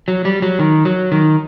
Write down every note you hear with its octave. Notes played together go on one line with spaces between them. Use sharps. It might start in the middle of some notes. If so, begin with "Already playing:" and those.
F#3
G3
F#3
D#3
F#3
D#3